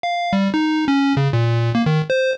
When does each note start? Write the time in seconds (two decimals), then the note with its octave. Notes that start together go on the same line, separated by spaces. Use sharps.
0.03 F5
0.33 G3
0.54 D#4
0.88 C#4
1.17 C#3
1.33 A#2
1.75 A#3
1.86 D#3
2.10 C5